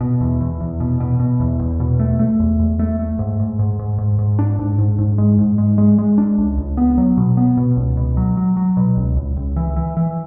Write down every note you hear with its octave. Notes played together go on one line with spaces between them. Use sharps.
B2
E2
E2
E2
B2
B2
B2
E2
E2
B2
A3
A3
E2
E2
A3
A3
G#2
G#2
G#2
G#2
G#2
G#2
D4
G#2
G#2
G#2
G#3
G#2
G#3
G#3
G#3
D4
C#2
C#2
B3
F#3
B2
B3
B2
C#2
B2
F#3
F#3
F#3
B2
C#2
C#2
C#2
E3
E3
E3